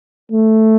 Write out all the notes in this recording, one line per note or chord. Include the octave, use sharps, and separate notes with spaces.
A3